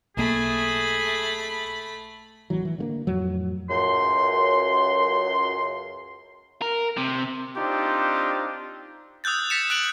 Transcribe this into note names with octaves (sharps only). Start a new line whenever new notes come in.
B1 A3 A#3 G#4 B5
A1 E3 F#3
E3
D3 A3 A#3
F2 A2 F#3
C#2 F#2 C6
A#4
C3
C4 D4 D#4 F4 G4
D#6 E6 F#6 G6 A6
G6 A6 B6 C#7 E7
F#6 D7 F#7